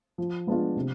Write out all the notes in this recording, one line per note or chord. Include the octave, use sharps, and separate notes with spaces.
F3
G#3 B3 D4 F4
C3